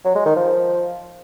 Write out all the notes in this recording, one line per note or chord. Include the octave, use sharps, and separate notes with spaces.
F#3
G#3
D#3
F3